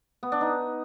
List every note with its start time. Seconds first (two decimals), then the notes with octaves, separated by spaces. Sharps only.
0.23 B3
0.32 D4
0.41 D#4